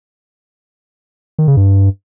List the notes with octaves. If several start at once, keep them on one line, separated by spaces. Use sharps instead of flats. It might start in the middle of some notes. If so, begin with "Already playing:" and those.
D#3
C#3
G2